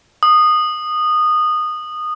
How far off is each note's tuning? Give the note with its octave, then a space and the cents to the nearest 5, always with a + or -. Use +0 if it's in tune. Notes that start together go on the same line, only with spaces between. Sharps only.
D#6 -15